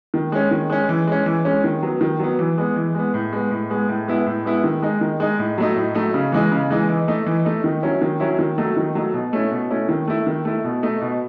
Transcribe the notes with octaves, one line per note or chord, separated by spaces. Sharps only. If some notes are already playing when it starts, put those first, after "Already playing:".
D#3
G#3 C#4
D#3
G#3 C#4
E3
G#3 C#4
E3
G#3 C#4
D#3
F#3 B3
D#3
F#3 B3
E3
G#3 B3
E3
G#3 B3
A2
G#3 B3
A2
G#3 B3
A2
G#3 B3 E4
A2
G#3 B3 E4
D#3
G#3 D#4
D#3
G#3 D#4
A2
F#3 A3 D#4
A2
F#3 A3 D#4
C#3
E3 G#3 D#4
C#3
E3 G#3 D#4
E3
A3 D#4
E3
A3 D#4
D#3
F#3 C#4 E4
D#3
F#3 C#4 E4
D#3
F#3 A3 D#4
D#3
F#3 A3 D#4
B2
A3 C#4 E4
B2
A3 C#4 E4
D#3
A3 E4
D#3
A3 E4
B2
A3 D#4
B2